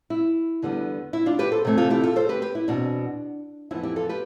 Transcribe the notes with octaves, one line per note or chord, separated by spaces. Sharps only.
E4
E2 D3 G3 B3
E4
D4 F4
G4 B4
A4 C5
C3 E3 A3 C4
F4 A4
E4 G4
F4 A4
A4 C5
G4 B4
G4 B4
E4
E2 B2 A3 C4 D4
F2 E3 B3 E4
E4 G4
F4 A4
G4 B4